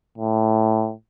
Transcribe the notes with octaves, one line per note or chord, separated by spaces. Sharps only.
A2